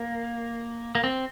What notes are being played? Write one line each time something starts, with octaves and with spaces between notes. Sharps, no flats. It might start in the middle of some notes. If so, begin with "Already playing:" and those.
Already playing: A#3
A#3
C4